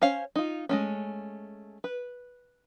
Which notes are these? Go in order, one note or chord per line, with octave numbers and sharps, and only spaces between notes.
C#4 C5 C#5 F5
D#4 F4
G#3 A3 C#4
B4